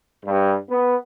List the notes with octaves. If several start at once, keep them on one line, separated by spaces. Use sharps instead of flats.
G2
B3